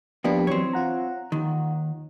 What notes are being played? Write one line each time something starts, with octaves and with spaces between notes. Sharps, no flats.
F3 A#3 B3 D4 G4
E3 F#3 C4 C#5
F4 F#5 A#5
D#2 D#3